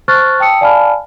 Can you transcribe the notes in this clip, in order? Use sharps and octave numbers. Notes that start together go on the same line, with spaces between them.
C5 A5 C#6 F6 F#6 A6
G5 A5 D#6 E6 C#7
D5 F5 G#5 A5 B5 F6